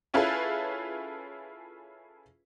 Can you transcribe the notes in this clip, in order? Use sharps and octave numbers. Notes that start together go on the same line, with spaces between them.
C#4 E4 F4 G#4 A4 B4